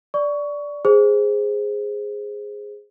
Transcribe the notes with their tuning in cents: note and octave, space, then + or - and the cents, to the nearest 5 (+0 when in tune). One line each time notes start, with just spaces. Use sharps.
D5 -10 C#6 +20
G#4 -5 C5 +0